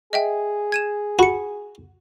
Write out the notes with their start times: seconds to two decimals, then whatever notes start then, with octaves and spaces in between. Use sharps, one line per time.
0.13 G#4 D#5 E5 G5
0.72 G#6 D#7 E7
1.19 F#4 B5 C#7